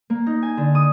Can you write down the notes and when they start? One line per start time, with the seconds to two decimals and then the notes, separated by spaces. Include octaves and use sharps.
0.10 A#3
0.26 D#4
0.42 G#5
0.57 D3
0.75 D#6